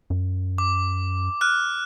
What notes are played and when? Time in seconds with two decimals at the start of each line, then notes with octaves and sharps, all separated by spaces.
0.10 F#2
0.58 D6
1.41 F6 F#6